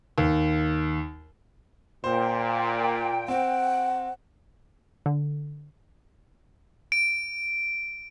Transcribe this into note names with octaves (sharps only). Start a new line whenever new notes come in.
D#2
A#2 C5 G5
C4 F#5
D3
D7